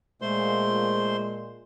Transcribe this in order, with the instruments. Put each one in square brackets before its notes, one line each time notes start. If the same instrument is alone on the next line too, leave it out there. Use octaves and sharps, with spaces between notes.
[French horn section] A#2 G#3 [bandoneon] A3 C5 C6